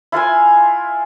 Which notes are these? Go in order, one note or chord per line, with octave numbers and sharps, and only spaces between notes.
E4 F4 C5 G#5